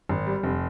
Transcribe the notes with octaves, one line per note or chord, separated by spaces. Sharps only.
G#1
G3
F1